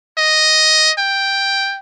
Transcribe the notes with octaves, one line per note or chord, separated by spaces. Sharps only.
D#5
G5